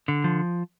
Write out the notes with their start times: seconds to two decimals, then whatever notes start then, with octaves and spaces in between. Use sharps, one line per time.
0.08 D3
0.24 F3